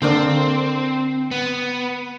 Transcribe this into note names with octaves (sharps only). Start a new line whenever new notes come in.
D3 A#3 C4 D4
B3